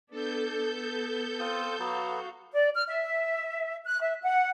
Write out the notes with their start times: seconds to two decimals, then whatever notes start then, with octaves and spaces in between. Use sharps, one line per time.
0.11 B3 D4 A4 G6
0.59 B3
1.40 C4 F4 D#6
1.79 F#3 B3 F#4 F5
2.53 D5
2.75 F6
2.87 E5
3.85 F#6
4.00 E5
4.22 F#5